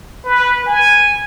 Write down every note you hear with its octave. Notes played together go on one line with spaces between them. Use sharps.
B4
G#5